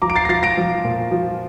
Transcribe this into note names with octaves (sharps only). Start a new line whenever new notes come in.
F3 A#5 D6
D7
A6 C7
A#6
F3 A6 C7
A#6 D7
F3
A#2
F3